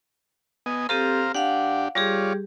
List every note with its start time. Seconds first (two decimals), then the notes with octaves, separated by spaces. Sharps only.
0.66 B3 D#5 G#5
0.89 C4 G4 A4 C5 F5 A#5
1.35 D4 G4 F5 F#5
1.95 G3 F4 G4 G#4 C#5 D5